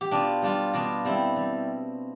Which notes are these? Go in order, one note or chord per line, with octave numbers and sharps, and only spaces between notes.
G4
B2 D4 F4
G3 D4 F4
B2 D4 F4
G3 C4 E4
G3